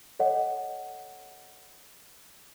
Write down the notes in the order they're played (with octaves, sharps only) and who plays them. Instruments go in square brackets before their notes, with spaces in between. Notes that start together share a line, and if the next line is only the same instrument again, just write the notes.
[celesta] A4 C#5 D#5 F#5